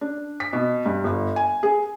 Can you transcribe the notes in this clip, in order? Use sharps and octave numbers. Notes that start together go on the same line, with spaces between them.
D4
B6
B2
G2
G1
G#5
G#4